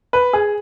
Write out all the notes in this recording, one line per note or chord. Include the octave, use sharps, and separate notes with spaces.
B4
G#4